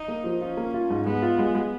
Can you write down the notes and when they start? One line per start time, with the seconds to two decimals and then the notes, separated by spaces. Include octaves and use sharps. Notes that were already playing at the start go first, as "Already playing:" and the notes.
Already playing: D#4
0.08 A#3
0.24 F3
0.41 C#4 F4
0.57 A#3
0.74 F4
0.90 G#2
1.06 G#3 B3
1.22 F4
1.39 G#3
1.55 G#3